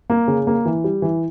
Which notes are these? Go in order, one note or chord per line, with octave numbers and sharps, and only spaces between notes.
A#3
C#3
A#3
E3
G3
E3